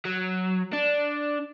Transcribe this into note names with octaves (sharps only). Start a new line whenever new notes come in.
F#3
D4